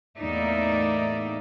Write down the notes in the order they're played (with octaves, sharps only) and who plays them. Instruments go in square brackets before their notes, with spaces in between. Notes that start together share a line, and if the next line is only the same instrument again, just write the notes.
[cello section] E2 A2 A#3 D#4 D5 E5